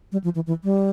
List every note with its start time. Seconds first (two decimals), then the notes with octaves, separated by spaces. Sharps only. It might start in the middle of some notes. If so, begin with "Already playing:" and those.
0.12 G3
0.24 F3
0.35 E3
0.47 E3
0.64 G3